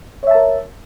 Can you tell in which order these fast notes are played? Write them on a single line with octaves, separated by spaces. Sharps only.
C#5 E5 A5 A#4